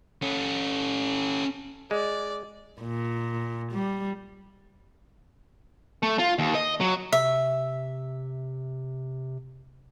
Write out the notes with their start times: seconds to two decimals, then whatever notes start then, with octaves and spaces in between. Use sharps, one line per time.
0.22 C#4 A4
1.91 G#3 D5
2.81 A#2
3.72 G3
6.03 A3
6.19 F4
6.39 D#2
6.55 D#5
6.80 F#3
7.12 C3 E5